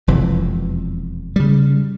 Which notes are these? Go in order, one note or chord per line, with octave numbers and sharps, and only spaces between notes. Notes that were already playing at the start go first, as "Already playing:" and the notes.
E1 F2 C3 E3
C#3 G3